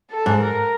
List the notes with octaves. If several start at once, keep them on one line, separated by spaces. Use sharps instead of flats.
A4
G#2
A#4